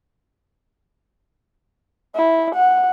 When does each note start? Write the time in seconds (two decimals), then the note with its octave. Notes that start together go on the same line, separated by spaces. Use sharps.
2.16 E4
2.55 F#5